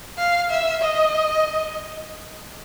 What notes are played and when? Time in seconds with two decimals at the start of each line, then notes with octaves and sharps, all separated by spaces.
0.18 F5
0.51 E5
0.82 D#5